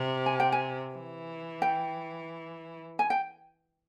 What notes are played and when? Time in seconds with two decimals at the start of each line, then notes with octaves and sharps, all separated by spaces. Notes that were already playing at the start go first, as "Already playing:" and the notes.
Already playing: C3
0.26 G#5
0.40 G5
0.52 G#5
0.94 E3
1.62 G5
2.99 G#5
3.10 G5